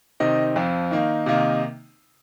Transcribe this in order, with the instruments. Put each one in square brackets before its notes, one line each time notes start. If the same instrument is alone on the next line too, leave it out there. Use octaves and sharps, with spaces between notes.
[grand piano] C3 D#3 C4 D#4 D#5
F2 F3 C4
D#3 A#3 D#4
C3 D#3 A#3 D#4